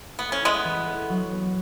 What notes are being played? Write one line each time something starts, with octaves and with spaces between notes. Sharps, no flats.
A3 B3
C#4
G#3 B3 E4
E3
A4
F#3
B3